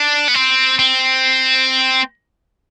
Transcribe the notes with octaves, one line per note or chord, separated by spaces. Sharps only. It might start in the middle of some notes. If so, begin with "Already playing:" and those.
Already playing: D4
B3
C4
C4